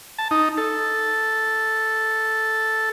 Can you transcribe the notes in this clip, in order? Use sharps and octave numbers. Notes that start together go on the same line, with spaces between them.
A5
D#4
A4